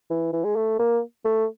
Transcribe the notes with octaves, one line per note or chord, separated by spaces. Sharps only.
E3
E3
G#3
A3
A#3
A3